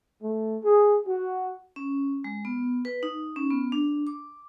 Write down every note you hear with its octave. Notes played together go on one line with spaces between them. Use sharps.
A3
G#4
F#4
C#4
G#3
B3
B4
D#4
C#4
B3
D4
D6